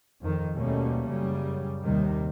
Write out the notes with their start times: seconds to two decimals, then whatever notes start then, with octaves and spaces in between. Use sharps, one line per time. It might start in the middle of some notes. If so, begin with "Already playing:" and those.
0.21 F2 D#3
0.55 D#2 B2 G3 A3 A#3 C#4
1.09 F#2 C#3 G3
1.81 D#2 C3 D#3 G3